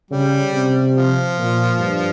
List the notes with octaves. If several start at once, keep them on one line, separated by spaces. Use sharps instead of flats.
C#3 G3
C3
F3
A#2
G2